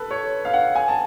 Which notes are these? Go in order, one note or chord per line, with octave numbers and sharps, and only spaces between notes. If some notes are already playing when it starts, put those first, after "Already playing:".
Already playing: A4 B4
C#5
F5
F#5
G#5
A5